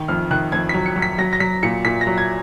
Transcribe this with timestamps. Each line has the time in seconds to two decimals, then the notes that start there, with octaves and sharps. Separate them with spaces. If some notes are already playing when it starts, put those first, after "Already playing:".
Already playing: D#3
0.08 F2 F6
0.31 D#3 F#6
0.52 F2 G#6
0.69 F#3 B6
0.86 C#7
0.96 F#3
1.02 B6
1.18 F#3 A#6
1.33 A#6
1.40 F#3 B6
1.63 A#2 C#7
1.85 A#2 B6
2.01 A#6
2.07 F#3
2.18 G#6